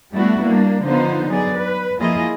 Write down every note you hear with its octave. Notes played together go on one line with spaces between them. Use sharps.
G3 A3 B3 D4 E4 F#4
G3 A#3 D4
D3 F3 B3 D#4 F4 C5
F#3 B3 G#4 D5
B4
F3 A#3 E4 F4 G#4 D#5